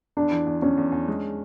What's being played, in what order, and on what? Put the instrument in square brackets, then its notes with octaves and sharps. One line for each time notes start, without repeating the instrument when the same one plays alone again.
[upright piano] E2 [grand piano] D4
[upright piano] E3
E2
[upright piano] E2 [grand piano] C#4
[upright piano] E2
E2
G#3